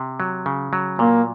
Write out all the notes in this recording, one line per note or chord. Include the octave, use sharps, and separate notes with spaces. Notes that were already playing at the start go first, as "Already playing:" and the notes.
Already playing: C3
F#3
C#3
F#3
A#2 A#3